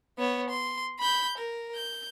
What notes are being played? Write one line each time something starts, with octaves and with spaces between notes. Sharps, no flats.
B3 C#5
C6
B5 G6
A#4
G6